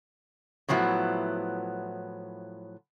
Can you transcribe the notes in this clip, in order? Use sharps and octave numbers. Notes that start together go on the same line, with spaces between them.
A2 F3 F#3 B3 E4